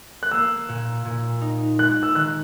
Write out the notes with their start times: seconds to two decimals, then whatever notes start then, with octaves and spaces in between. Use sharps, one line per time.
0.23 F#6
0.32 A#3 E6
0.69 A#2
1.05 A#2
1.41 D#4
1.79 G#3 F#6
2.03 E6
2.15 D#3 F#6